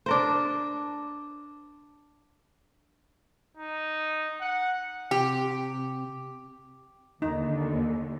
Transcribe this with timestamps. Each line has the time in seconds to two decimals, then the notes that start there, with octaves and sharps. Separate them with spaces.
0.06 D4 A#4 C5
3.57 D#4
4.40 F#5
5.11 C3 G4
7.22 D#2 D3 D#4